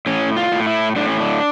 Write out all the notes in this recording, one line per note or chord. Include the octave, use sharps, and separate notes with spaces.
A2 C#4
F4
A2
E4
A2 D4
C#4
D4